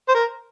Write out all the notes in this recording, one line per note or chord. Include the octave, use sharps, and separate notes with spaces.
C5
A#4